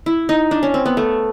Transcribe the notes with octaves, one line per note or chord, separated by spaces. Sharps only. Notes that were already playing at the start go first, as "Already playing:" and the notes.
E4
D#4
D4
C#4
C4
B3
A3